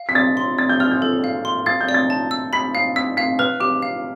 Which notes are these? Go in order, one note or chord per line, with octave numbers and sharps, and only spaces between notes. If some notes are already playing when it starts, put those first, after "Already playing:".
Already playing: F5
B6
D5 A6
C6
D5 A6
G6
D5 F6
G6
A4
F5
C6
F5 A6
G6
D5
A6
A5
E6
B5 B6
F5 C7
E6 B6
F5 B6
B4 F6
G4 D6
F5